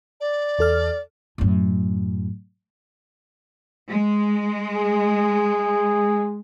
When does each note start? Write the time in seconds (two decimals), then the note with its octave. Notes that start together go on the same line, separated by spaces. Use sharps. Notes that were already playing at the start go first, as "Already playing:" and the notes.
0.20 D5
0.59 E2 A4 F6
1.38 F#2 A2
3.91 G#3
4.75 G#4